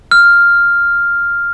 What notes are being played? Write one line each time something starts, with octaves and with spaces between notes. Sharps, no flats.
F6